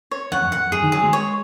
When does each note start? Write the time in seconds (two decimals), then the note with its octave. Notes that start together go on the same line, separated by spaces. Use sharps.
0.11 C#5
0.32 F2 F#5
0.43 F#2
0.52 F2 F#5
0.72 F#2 G#4
0.82 D#3
0.92 F#3 G#4
1.02 G#3
1.13 C#5